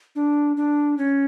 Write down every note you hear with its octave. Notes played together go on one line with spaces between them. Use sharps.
D4
D4
C#4